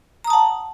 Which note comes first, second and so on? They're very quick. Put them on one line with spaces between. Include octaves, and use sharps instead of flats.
A#5 D#6 A5 F#5